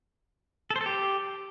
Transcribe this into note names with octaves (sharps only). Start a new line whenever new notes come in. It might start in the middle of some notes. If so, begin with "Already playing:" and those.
A4
C5
A4
G4